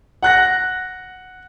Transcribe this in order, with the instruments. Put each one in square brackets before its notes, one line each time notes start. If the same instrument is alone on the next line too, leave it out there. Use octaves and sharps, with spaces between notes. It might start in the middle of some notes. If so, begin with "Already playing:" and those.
[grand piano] F#5 F#6 A#6